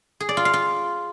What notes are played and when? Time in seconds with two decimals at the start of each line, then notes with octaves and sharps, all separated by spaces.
0.20 G#4
0.29 D5
0.37 F4
0.45 F5
0.54 F4